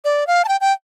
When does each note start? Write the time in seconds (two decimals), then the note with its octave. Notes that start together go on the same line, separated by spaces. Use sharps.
0.05 D5
0.27 F5
0.45 A5
0.48 G5
0.61 G5